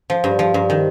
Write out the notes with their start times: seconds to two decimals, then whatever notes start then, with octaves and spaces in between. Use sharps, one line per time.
0.10 F3
0.24 G2
0.39 F3
0.54 G2
0.70 D#3